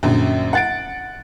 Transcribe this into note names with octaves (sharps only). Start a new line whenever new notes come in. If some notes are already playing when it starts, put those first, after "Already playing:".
A#1 F#2 D3
F#5 A6 D7